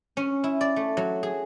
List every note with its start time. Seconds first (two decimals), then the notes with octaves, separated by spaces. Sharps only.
0.17 C#4
0.44 E4
0.61 D5
0.76 A3
0.97 F#3
1.23 G#4